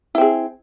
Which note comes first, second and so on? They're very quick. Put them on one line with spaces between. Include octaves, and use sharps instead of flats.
E4 C4 G#4